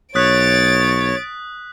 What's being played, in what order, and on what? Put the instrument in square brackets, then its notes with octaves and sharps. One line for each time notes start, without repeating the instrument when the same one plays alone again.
[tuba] B1 [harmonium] C#5 [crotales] D#6 F#6 B6 [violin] A6 D7